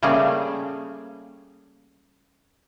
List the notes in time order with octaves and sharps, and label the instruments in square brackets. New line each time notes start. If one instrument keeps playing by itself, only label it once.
[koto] C#3 G3 A3 A#3 G#4